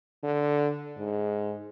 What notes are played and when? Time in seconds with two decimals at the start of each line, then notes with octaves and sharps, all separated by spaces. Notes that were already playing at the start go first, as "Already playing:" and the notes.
0.23 D3
0.98 G#2